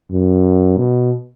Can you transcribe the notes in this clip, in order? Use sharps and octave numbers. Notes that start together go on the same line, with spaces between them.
F#2
B2